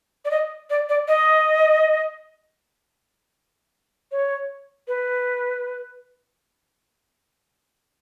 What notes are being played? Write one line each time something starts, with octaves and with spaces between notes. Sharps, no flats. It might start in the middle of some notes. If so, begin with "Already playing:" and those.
D5
D#5
D5
D5
D#5
C#5
B4